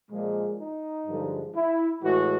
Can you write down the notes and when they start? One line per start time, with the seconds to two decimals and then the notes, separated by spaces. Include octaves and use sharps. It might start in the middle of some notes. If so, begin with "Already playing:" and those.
0.11 A#2 F3 G#3
0.59 D#4
1.07 G2 D3 F3 G#3
1.55 E4
2.03 A2 E3 G#3 F#4